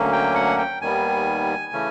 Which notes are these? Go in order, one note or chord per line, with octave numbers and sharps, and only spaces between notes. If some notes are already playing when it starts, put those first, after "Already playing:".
Already playing: D2 D3 F#3 A#3 C#4
G5
F#5
G5
D#2 D#3 G3 B3 G#5
C#3 E3 A3 C#4